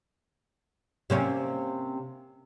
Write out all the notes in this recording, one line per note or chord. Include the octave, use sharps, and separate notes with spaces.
C3 A#3 C#4